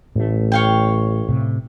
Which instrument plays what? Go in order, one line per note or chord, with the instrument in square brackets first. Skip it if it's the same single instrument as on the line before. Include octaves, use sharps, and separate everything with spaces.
[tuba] A1 [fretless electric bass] A2 A3
[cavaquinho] C#5 F5 G5
[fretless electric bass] A2 C3